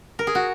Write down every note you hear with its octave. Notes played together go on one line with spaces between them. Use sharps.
A#4
G#4
F#4